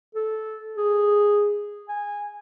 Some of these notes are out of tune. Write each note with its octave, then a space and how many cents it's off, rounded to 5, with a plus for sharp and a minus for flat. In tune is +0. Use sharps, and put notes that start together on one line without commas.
A4 -10
G#4 -10
G#5 -15